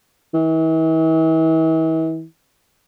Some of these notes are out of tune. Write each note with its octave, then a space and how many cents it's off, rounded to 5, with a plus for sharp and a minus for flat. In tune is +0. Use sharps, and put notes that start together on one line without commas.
E3 -40